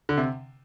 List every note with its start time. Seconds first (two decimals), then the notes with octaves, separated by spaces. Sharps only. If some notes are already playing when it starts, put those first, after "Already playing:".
0.09 D3
0.17 C3